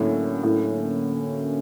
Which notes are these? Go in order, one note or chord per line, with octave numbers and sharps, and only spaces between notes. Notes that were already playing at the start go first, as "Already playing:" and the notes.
Already playing: A2 D3 F#3 A#3 C#4
A2